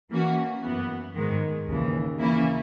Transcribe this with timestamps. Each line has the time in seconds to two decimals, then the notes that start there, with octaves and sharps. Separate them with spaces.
0.11 E3 A#3 C#4 F#4
0.63 F#2 E3 B3
1.16 G#2 D#3 G#3
1.68 D#2 C#3 E3
2.20 C#3 E3 A#3 C#4 E4